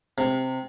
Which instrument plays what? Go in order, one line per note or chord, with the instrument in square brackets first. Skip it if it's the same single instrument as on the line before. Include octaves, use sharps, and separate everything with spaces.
[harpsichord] C3